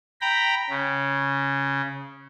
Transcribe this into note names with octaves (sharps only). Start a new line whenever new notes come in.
G5 A#5 B5
C#3